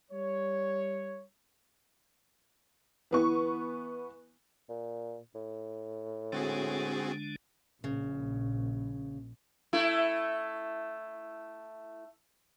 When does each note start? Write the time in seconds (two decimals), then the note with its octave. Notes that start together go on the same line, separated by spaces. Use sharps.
0.11 G3 C#5
3.11 E3 B3 C#6
4.69 A#2
5.35 A2
6.32 D3 G#3 C4 D4 F#4 G#4
7.84 A#1 C#3
9.73 A3 E4